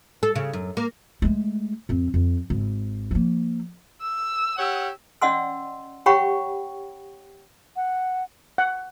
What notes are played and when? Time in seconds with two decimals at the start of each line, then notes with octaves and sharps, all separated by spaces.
0.23 A4
0.35 C#3
0.53 F#2
0.77 A#3
1.22 G#3 A3
1.89 F2 C4
2.14 F2
2.50 G#1
3.11 F3 A#3
4.02 E6
4.58 G4 C#5 F#5
5.22 C#4 D5 D#5 F#5 C6 E6
6.06 G4 C#5 F#5 G5 B5 C#6
7.76 F#5
8.58 F#5